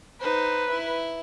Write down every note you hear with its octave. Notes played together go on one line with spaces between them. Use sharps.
D#4 B4 C5
E4 E5